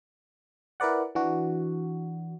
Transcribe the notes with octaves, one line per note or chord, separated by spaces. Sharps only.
E4 A#4 B4 D5 F#5
E3 D4 F#4